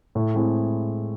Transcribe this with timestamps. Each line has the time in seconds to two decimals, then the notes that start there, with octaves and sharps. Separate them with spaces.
0.15 A2
0.34 G#3 C4 E4 G#4